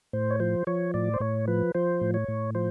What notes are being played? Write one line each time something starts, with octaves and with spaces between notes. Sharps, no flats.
A2 C5
C#5
F3 C5
F3 C#5
A2 D5
C5
A2 C#5
F3 B4
F3 C5
A2
C#5
A2
F3 C5